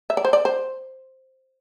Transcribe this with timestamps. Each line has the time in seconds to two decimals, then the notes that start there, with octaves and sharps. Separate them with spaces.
0.10 E5
0.17 D5
0.25 C5
0.33 D5
0.45 C5